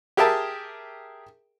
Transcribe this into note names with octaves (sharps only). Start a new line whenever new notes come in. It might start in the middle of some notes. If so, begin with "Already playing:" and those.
G4 G#4 A#4 E5 G5 A5